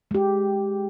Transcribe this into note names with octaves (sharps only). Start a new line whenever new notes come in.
G#3 G4